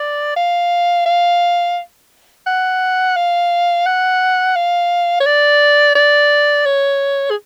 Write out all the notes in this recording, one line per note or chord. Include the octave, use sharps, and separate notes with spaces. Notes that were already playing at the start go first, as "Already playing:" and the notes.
Already playing: D5
F5
F5
F#5
F5
F#5
F5
C#5
D5
D5
C#5
G#4